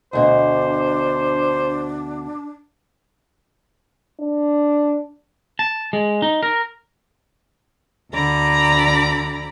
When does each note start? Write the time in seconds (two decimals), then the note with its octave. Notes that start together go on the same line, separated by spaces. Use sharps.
0.13 D2 B2 D4 C5
4.20 D4
5.59 A5
5.93 G#3
6.22 D#4
6.43 A#4
8.13 D2 D3 D5 A#5 B5